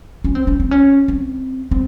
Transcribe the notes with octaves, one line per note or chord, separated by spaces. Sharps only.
C#4
C4
C#4
C4
C#4
C4
C4